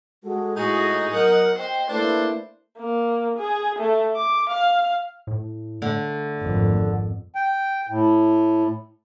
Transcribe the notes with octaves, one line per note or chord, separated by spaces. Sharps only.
G#3 F#4 A4
A2 D#4 F#4 G#4
F#3 A#4 F#5
C5 D#5 G5
A3 A#3 D4 E4 B4 C5
A#3
G#4
A3
D6
F5
A2
D3 A3
G#1 F2
G5
A2